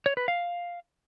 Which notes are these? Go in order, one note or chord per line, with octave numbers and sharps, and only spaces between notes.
C#5
B4
F5